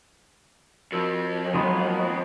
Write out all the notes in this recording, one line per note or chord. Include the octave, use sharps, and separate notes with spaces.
F2 F#4 A#4 E6
D#3 F#3 G#3 A#3 B3 B5 C6 D#6